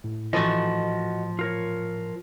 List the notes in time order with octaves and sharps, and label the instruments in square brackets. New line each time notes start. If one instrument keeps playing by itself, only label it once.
[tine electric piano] A2
[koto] E3 A3 [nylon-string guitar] F3 [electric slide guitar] F#4 D#5
[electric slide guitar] F4 A#4 C#5